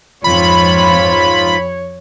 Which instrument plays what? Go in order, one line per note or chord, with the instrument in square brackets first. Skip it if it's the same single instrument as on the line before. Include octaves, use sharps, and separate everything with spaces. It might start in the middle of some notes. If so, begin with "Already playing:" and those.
[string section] F2 [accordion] G#2 F4 [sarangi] C#5 [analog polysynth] B5